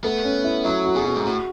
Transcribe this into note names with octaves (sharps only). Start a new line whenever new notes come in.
A3 B3
C#4
E4
F#3 E4
F#4
B2 G#4
F#4
G#2
A2 F#4